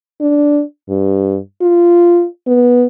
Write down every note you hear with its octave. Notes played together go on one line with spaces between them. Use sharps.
D4
G2
F4
B3